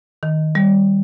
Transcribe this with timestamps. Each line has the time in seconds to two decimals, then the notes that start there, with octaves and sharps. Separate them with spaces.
0.23 D#3
0.55 G3